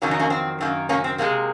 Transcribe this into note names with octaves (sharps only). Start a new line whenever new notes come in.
F2 D#3 F#3 A#3 C#4
D#4
A#3 C#4
C4
F#2 D#3 A#3
A#3 C#4
C4
C3 F3 G#3 A#3